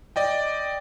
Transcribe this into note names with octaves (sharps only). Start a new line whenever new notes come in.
D5 D#5 G5